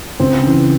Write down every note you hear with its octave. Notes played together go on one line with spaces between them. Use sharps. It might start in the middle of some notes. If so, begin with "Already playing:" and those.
C#2 C4
C#3 E3